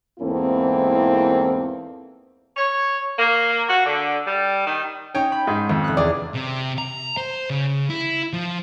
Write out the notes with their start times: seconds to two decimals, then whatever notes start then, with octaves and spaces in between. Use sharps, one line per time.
0.19 E2 G#2 A#3 C4 E4 A4
2.57 C#5
3.18 A#3
3.69 F#4
3.85 D3
4.25 G3
4.66 D#3
5.15 C#4 D#4 C#5 G5
5.32 B5 G6
5.47 G#2
5.69 F2 D#3
5.84 F1 F#6
5.97 E2 G#4 D5
6.34 C3
6.78 A#5
7.17 C5
7.50 C#3
7.90 E4
8.33 F3